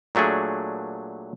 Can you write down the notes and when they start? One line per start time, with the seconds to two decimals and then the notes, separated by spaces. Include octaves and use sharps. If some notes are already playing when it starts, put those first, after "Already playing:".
0.15 A#2 F#3 A3 D4 G#4